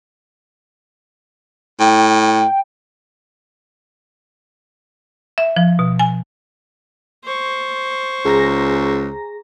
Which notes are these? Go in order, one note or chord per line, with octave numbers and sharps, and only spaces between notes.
A2 G5
E5
F3
B2
G#5
C5 C#6
C#2 G#4 A#5 A#6